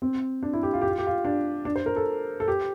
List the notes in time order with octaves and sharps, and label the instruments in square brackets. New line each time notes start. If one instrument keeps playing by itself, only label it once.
[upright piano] C4
D4
E4
G4
F4
G4
F4
G4
F4
D4
D4
C5
A#4
A4
A4
G4